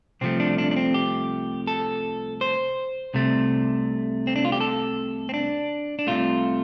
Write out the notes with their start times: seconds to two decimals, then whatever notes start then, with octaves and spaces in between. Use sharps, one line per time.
0.21 C2 C3 F3 A3 C4
0.40 D4
0.58 D4
0.71 D4
0.76 C4
0.94 G4
1.67 A4
2.41 C5
3.14 C2 C3 A3
4.27 C4
4.36 D4
4.45 F4
4.52 G4
4.61 A4
5.29 C4
5.34 D4
5.99 D4
6.07 C2 C3 A3 F4